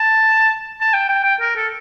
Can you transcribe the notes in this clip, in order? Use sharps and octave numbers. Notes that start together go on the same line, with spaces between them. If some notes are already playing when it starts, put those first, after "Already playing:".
Already playing: A5
A5
G5
G5
G5
A#4
A4